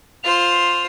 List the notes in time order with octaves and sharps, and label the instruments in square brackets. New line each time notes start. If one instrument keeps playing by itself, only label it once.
[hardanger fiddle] F4 C5 [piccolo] F7